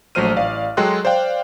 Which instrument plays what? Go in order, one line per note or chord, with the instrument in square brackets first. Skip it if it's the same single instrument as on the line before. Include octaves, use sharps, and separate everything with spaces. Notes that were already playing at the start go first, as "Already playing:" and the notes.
[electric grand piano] A#1 F#3 A3 C5 F6 D#7
A1 D5 F5
F#3 G#3 A4 G5 C6 F#6
C5 D5 F5 G5